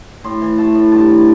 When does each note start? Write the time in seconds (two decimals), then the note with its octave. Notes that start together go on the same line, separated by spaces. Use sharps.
0.24 A2 C6
0.42 E3
0.58 A3 A5
0.75 A2
0.92 G2 A5
1.09 E3